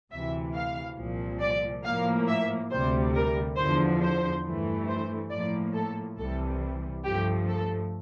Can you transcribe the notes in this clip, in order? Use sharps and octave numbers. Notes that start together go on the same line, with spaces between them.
D2 C3 E3 E5
F5
C2 A#2 F3
D5
A2 F3 A#3 F5
E5
D2 C3 G3 C5
A#4
E2 D3 F3 C5
C5
G2 E3 A3
C5
A2 F3 A#3 D5
A4
C2 C3 E3 G3 A4
G2 F3 A3 G4
A4